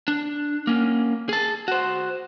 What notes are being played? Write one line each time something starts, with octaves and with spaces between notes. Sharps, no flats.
D4
A#3 C#4
G#4 A5
F#4 C5